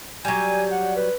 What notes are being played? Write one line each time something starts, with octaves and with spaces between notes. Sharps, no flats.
F#3 G3 G#5
F#5
B4